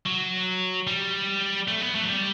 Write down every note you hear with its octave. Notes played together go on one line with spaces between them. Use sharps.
F#3
G3
A3
B3
A3
F#3
G3